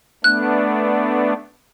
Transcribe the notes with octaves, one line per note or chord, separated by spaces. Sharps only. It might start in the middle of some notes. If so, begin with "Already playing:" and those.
A3 B3 D4 F#6